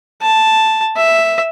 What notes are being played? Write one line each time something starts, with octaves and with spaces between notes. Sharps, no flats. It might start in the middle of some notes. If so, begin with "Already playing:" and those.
A5
E5